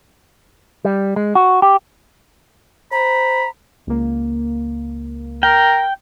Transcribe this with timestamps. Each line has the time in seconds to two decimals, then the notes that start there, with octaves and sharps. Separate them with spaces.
0.85 G3
1.16 G#3
1.35 F#4
1.62 G4
2.92 C5 A#5 B5
3.87 C#2 A#3
5.43 A#4 G5